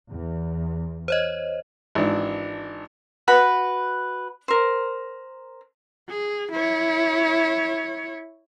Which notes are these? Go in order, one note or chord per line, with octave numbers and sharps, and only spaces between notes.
E2
C5 C#5 D#5
G#1 E3 D4
F#4 B4 B5
A#4 C5
G#4
E4 C#5